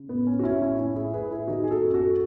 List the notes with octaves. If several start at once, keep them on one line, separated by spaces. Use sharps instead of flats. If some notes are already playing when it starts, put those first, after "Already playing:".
Already playing: C#3
A2 B3
C#4
F#4
A2 C#4 E4
C#4 E4
A2 C#4 E4
E4 G#4
A2 G#4 B4
E4 G#4
D#3 D#4 F#4
G#4
F#4 A4
F#2
F#4 A4